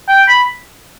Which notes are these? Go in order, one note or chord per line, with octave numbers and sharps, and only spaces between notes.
G5
B5